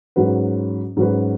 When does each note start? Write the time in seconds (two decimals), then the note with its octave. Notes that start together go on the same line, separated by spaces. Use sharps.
0.16 G#2 F#3 C#4 F#4 B4
0.97 G#2 F#3 C#4 F#4 B4